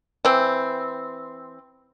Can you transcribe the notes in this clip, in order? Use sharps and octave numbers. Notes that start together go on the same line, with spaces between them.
E3 C4